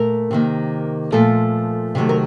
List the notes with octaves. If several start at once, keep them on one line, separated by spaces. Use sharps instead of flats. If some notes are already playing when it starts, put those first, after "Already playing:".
Already playing: A#2 A3 A#4
C3 D#3 A#3
A#2 F3 A3 A4
C3 D#3 F#3 A3
A#4